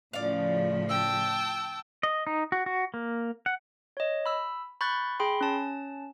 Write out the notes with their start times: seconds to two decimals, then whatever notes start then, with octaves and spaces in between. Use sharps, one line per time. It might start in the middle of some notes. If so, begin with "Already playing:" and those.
0.13 A2 C#3 F3 D5 F5
0.89 G5 A5 E6
2.03 D#5
2.27 D#4
2.52 F#4
2.66 F#4
2.94 A#3
3.46 F#5
3.97 C#5 D#5
4.26 B5 E6
4.81 B5 C#6 F#6 G6 A6
5.20 G#4 G5 B5 C6
5.41 C#4 A5